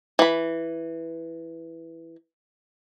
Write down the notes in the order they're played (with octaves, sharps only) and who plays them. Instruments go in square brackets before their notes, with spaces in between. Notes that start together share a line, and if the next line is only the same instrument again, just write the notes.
[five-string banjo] E3 B5